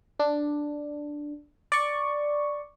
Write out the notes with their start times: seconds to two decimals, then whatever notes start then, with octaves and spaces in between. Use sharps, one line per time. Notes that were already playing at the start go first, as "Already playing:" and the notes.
0.19 D4
1.72 D5 C#6